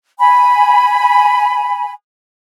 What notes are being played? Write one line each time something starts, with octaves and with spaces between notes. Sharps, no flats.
G#5 B5